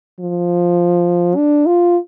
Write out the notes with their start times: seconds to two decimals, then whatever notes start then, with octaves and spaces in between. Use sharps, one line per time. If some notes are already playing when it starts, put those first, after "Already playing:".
0.20 F3
1.37 D4
1.66 F4